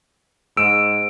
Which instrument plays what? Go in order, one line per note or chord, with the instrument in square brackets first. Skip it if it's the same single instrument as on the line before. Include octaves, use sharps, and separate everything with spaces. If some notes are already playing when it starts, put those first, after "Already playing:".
[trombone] G#2 [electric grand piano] E6 [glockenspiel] D7